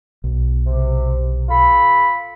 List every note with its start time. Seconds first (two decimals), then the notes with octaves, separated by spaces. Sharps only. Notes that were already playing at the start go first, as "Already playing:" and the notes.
0.24 B1
0.66 C3
1.49 F4 A4 B5